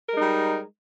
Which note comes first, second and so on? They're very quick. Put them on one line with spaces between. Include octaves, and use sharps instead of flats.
A#4 G#3 D#4 G3